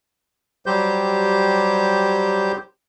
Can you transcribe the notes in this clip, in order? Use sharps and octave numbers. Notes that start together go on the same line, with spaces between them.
F#3 G3 G4 C5 G6